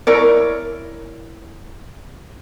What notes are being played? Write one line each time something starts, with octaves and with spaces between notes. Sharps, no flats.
E4 A#4 C#5 D5